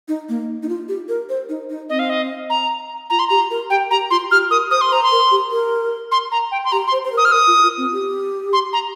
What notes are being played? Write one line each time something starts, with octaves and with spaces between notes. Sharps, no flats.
D#4
A#3
D#4
F4
G4
A#4
C5
D#4
D#4
C4 D#5
F5
D#5
A#5
F4 A#5
C6
G4 A#5
A#4
G4 G5
G4 A#5
F4 C6
G4 F6
A#4 D#6
C5 D#6
C6
C5 A#5
C6
A#4
G4
A#4
C6
A#5
G5
C6
G4 A#5
C6
C5
C5
A#4
D#6
F6
A#4 D#6
F4
F4
C4
G4
C6
A#5